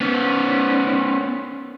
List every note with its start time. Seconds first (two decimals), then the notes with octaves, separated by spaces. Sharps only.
0.01 B3 C#4